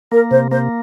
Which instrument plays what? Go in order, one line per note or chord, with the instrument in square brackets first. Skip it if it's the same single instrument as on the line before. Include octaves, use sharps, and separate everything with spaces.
[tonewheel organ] A#3 [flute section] A#4
[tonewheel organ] C3 [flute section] C5
[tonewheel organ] A#3 [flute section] C5